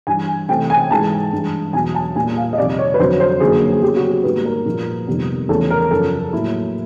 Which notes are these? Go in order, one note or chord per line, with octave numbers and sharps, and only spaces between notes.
G2 E3 G3 G#5
C3 E3 A3 C4 G5
G#5
G#2 E3 G#3 A5
G2 E3 G#3
E2 B2 F#3 G#5
A5
A#2 G3 A#3 G#5
F5
D#5
F2 C3 D#3 G3 C4 D5
C#5
B4
F2 D3 F#3 C5
C5
F#2 D3 F#3 A#3 G#4
G#4
C#3 F#3 B3 G4
F#4
G4
G#2 D#3 G3 A#3 B4
A#4
A#2 F3 A#3
F2 C3 D#3 G3 B3
E2 C#3 F3 A3 A4
A#4
F#2 C#3 F3 A4
A2 F#3 A#3 E4